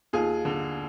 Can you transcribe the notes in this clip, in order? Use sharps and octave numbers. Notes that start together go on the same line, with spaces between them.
D#2 F4 G#4
D3